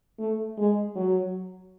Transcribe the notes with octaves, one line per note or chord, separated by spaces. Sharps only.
A3
G#3
F#3